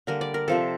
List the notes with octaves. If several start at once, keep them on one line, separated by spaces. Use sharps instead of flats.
D3 G3 A#3 A#4
D5
A#4
C3 F3 C4 A4